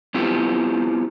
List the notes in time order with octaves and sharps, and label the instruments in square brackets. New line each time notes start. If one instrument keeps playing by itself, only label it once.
[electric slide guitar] B3 C4 E4 F4 G4